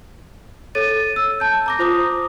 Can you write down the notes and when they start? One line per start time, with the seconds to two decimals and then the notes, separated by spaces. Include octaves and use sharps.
0.75 A4 C#5 A6 D#7
1.16 E6
1.40 A5 G6
1.66 A#5 D6 A#6
1.79 F4 C5 D6 D#6